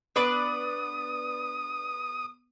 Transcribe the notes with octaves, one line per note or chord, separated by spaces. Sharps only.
B3 D4 B4 D5 D#6